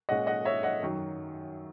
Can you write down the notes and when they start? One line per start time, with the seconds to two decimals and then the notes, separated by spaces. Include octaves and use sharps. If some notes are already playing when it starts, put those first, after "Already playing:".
0.09 A#2 G#3 C#4 D#5 F#5
0.27 D#5 F#5
0.45 C#5 E5
0.63 D#5 F#5
0.82 F#2 D#3 F#3